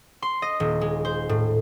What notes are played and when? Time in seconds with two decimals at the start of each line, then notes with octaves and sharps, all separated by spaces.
0.22 C6
0.42 D#5
0.60 D#1
0.81 G#3
1.05 C5
1.29 A2